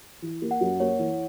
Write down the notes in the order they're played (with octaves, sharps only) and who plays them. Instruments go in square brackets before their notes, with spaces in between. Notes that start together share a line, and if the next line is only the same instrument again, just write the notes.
[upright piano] E3
A#3
[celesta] F#5
[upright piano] F#2
[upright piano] A#3 [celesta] C#5
[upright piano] E3